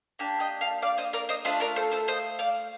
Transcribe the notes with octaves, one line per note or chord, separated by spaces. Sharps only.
A#3 D4 G4
D#5 G5
F5 A5
D5 F5
C5 D#5
A#4 D5
C5 D#5
A3 D4 F4 C5 D#5
A#4 D5
A4 C5
A4 C5
C5 D#5
D5 F5